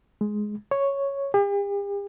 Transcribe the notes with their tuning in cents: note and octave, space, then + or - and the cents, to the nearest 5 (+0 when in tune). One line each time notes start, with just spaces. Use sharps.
G#3 +10
C#5 +0
G4 +45